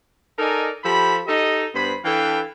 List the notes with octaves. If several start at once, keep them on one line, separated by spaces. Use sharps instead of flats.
D#4 A4 A#4 D5 D#5 G#5
F3 G4 A4 B5
D#4 G4 A4 D#5
G2 B3 C5 B5
E3 D4 A4 B4 F5 G5